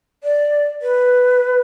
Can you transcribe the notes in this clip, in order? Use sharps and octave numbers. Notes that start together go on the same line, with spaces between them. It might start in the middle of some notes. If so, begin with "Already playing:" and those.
D5
B4